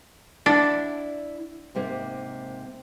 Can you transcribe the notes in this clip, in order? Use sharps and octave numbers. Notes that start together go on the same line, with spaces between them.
D4 E4 D5 F#5
G#2 C3 A#3